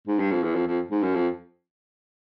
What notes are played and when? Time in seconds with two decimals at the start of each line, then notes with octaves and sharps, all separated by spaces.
0.07 G#2
0.19 G2
0.31 F2
0.43 E2
0.55 F2
0.67 F2
0.91 G#2
1.03 F#2
1.15 F2